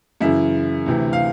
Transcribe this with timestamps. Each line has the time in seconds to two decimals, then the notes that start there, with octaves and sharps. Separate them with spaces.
0.21 F#2 C#3 E3 E4 E5
0.86 D2 C3 E3
1.13 F5